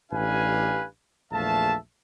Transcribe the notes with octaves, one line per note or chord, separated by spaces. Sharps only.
A1 D4 G4 B4 F5 G#5
A#1 E2 A3 E5 F5 A5